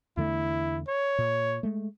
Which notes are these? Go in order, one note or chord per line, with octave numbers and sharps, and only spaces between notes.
E2 D3 A3 E4
C#5
A#2
G#3 A3